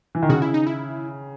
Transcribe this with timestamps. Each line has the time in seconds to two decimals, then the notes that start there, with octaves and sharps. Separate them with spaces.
0.15 E3
0.23 D#3
0.29 C#3 F#4
0.42 E4
0.54 D#4
0.67 E4